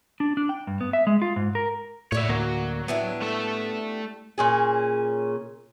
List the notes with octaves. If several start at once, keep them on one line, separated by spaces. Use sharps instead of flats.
D4
D4
G5
G2
B3
E5
G#3
F4
G#2
A#4
A2 F#4 C#5 D5 E5
D2 F#3 A#3
B3 D4 E4 G4
A3 E5
A#2 C#4 G#4